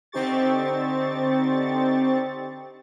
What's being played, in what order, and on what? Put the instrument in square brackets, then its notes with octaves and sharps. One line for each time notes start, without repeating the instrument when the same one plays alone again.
[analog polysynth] D3 C4 D#4 G4 C#6 A6